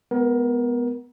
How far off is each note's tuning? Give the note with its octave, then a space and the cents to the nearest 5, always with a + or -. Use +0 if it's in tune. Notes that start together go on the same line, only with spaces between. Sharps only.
G#3 +15 B3 +0 A#4 +25